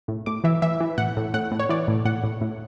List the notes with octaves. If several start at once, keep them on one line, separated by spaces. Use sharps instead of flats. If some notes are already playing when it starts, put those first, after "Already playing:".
A2
A2 D6
E3 E5
E3 E5
E3
A2 F#5
A2
A2 F#5
A2
C#5
E3 D5
A2
A2 F#5
A2
A2